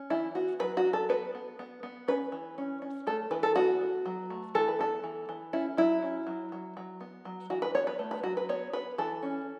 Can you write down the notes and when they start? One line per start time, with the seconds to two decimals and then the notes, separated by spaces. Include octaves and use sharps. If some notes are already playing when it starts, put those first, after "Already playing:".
Already playing: C#4
0.10 E3 E4
0.35 B3 F#4
0.59 F#3 B4
0.77 F#4
0.85 F#3
0.93 A4
1.09 B3 B4
1.35 B3
1.59 B3
1.83 B3
2.08 C#4 B4
2.32 E3
2.58 C#4
2.82 C#4
3.07 A3 A4
3.31 E3 B4
3.43 A4
3.56 B3 F#4
3.81 B3
4.06 F#3
4.30 A3
4.55 E3 A4
4.68 B4
4.79 B3 A4
5.04 E3
5.29 E3
5.53 C#4 E4
5.77 F#3 E4
6.03 C#4
6.27 F#3
6.52 F#3
6.77 F#3
7.01 B3
7.25 F#3
7.50 E3 F#4
7.62 B4
7.75 B3 C#5
7.87 B4
7.99 A3
8.11 B4
8.23 F#3 F#4
8.37 B4
8.49 B3 C#5
8.73 B3 B4
8.98 E3 A4
9.23 C#4